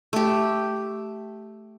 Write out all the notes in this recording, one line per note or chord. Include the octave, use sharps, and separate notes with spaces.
A3 G4